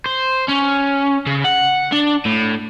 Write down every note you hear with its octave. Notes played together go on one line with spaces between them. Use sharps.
C5
C#4
C#3
F#5
D4
A2